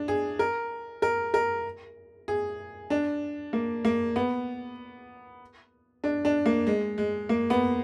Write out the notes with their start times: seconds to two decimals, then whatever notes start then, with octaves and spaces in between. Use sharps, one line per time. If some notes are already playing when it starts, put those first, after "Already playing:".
Already playing: D4
0.08 G#4
0.39 A#4
1.02 A#4
1.34 A#4
2.28 G#4
2.90 D4
3.53 A#3
3.85 A#3
4.16 B3
6.04 D4
6.25 D4
6.46 A#3
6.67 G#3
6.98 G#3
7.29 A#3
7.50 B3